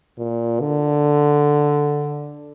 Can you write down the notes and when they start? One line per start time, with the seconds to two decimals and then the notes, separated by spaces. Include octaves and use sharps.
0.18 A#2
0.60 D3